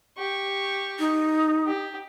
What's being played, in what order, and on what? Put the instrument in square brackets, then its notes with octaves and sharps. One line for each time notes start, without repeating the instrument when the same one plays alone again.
[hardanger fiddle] G4 C#6
[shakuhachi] D#4
[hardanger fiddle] G4